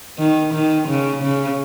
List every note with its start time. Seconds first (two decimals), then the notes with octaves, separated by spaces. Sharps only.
0.19 D#3
0.54 D#3
0.88 C#3
1.24 C#3